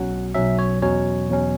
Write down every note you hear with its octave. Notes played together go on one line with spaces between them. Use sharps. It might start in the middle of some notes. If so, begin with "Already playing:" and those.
Already playing: B1 B2 F#3 C#4 F#5
B1 B2 F#3 C#4 E5
C#5
E2 B2 F#3 C#4 C#5
E2 B2 F#3 C#4